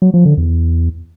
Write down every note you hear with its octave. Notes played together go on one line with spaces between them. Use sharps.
F#3
F3
D3
E2